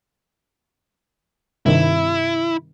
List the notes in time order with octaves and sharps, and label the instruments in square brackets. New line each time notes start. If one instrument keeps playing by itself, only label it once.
[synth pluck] G2 C3 D#3 [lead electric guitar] E4